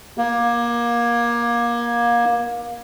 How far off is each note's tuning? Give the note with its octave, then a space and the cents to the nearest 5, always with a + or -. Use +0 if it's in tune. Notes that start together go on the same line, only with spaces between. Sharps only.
A#3 +25